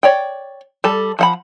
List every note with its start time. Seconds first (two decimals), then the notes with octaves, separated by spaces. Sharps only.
0.03 C#5 D5 G5
0.84 G3 A4
1.19 F3 F#5 B5